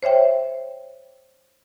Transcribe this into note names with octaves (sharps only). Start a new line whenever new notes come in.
C5 C#5 E5 G5